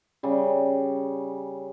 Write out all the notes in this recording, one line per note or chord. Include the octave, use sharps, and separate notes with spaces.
C#3 G3